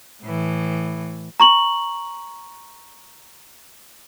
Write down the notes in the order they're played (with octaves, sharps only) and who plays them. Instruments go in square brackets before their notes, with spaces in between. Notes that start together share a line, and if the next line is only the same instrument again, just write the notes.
[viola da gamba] A2 E3
[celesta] A#5 C#6 F#7